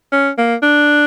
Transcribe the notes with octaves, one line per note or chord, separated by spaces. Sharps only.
C#4
A#3
D4